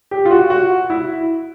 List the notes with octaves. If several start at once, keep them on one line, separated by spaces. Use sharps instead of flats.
G4
F4
F#4
F#4
E4